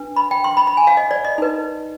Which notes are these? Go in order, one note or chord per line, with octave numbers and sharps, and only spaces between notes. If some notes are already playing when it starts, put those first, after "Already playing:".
Already playing: D4 B4
B5
G5
C6
B5
B5
G#5
F5
D#5
D5
D#5
D#4 B4